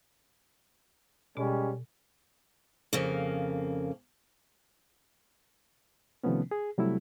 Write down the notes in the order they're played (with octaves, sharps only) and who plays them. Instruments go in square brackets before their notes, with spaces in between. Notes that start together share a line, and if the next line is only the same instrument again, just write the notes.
[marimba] B2 [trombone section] G3 G#3 C#4
[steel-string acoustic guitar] F2 C#3 A#3
[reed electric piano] C3 D#3 F3 A3 B3 C#4
G#4
C3 F#3 G3 A3 E4